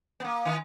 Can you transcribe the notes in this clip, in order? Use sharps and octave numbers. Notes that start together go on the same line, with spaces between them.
B3
A#3
D#3